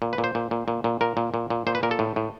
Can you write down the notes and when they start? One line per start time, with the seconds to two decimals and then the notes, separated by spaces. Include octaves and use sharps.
0.02 A#2
0.13 B4
0.18 A#2
0.24 C5
0.35 A#2
0.51 A#2
0.68 A#2
0.84 A#2
1.01 A#2 A#4
1.17 A#2
1.34 A#2
1.50 A#2
1.67 A#2 C5
1.75 B4
1.83 A#2 A#4
1.91 A4
1.99 A2
2.16 A2